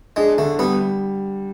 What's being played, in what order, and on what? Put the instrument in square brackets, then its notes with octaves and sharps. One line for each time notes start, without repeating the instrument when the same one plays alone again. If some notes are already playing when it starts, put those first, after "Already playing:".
[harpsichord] G#3 [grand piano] D4
[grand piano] D3 [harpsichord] A3
[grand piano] G3 [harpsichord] B3